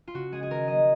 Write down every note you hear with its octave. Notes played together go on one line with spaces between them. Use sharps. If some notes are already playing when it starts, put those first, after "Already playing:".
F4
C#3 F#4
G#3 G#4
G#4
D#3 A#4
F#3 A#3 D#5